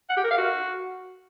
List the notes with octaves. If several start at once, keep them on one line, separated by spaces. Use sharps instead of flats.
F#5
G4
A#4
F5
F#4